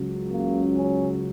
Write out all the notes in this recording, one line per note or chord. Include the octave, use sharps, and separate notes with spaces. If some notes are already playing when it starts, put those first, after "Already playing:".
Already playing: C#2 C#3 F#3
A#3
C#4